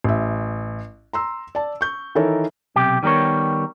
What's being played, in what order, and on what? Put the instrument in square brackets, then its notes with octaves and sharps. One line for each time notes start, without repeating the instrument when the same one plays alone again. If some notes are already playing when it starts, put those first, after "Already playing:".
[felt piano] A1 E5
A#5 C6 E6
D5 A5
C#6 G6
D#3 E3 D#4 A4 A#4 C#5
[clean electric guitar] B1 C3 G4
D#3 G3 B3 A#4 C#5